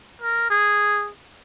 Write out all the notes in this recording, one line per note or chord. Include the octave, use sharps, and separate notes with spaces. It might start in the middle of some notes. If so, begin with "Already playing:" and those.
A#4
G#4